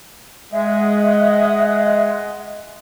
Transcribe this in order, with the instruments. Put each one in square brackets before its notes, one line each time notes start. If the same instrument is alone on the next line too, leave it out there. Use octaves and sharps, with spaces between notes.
[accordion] G#3 [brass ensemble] D#5 F#5 [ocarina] E5